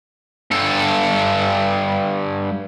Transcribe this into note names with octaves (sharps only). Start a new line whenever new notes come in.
G2 A4